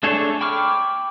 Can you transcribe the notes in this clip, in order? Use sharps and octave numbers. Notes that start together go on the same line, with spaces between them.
A3 D4 G#4 A4 C#5
G5 B5 C#6 D6 F6